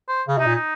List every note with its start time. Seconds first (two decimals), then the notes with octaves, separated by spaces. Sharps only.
0.09 C5
0.28 C#3
0.38 C3 D#4
0.46 A#2
0.56 D#4